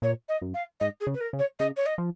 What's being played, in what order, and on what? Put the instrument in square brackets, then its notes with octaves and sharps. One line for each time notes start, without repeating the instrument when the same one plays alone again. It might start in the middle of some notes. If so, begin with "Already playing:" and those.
[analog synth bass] A#2 [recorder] C#5
[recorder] D#5
[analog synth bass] F#2
[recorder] F5
[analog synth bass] G#2 [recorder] D#5
[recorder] G#4
[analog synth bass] C#3
[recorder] B4
A#4
[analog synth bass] C#3
[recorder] C#5
[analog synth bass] C#3 [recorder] D#5
[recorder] C#5
D#5
[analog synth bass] F3